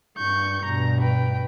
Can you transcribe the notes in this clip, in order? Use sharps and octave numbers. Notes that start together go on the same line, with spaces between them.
G2 C#6 G6
G2 B2 A#5
B4 G5